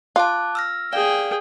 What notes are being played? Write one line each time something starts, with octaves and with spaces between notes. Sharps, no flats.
F4 A5 D6 F#6
E6 F6 A#6
G#4 D5 F5 G5